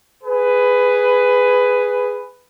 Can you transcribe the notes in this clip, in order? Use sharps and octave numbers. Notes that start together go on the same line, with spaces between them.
G#4 B4